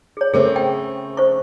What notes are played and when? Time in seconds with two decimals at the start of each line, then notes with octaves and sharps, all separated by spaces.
0.17 G#4 C#5
0.34 C#3 A3 C4 G#4 A#4 C5
0.56 G5
1.17 C5 C#6